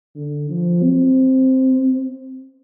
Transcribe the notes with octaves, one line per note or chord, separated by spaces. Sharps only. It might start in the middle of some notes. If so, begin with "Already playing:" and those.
D3
F3
C4